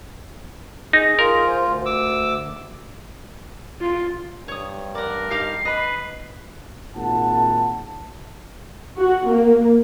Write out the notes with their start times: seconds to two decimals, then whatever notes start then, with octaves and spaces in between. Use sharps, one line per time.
0.93 D#4 G#4 A#6
1.19 F4 A#4
1.47 C5 G#5
1.60 D2
1.86 D6 E6
3.81 F4
4.48 G2 C#5 D#6
4.95 A#4 D5 F#5
5.31 D#4 G4 F5 C7
5.65 B4 D#5 B5
6.95 G#1 A#2 F#5 A5
8.97 F#4
9.29 A#3